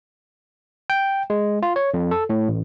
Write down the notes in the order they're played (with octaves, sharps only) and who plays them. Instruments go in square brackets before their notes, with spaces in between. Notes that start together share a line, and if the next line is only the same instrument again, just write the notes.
[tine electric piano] G5
G#3
F4
C#5
F2
A4
A2
A1